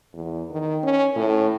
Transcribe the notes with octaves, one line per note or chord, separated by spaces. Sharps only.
E2
D#3
C#4
A2